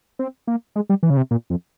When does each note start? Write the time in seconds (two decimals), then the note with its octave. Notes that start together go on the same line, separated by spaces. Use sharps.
0.19 C4
0.47 A#3
0.76 G#3
0.89 G3
1.03 E3
1.10 C#3
1.17 C3
1.31 A#2
1.50 F2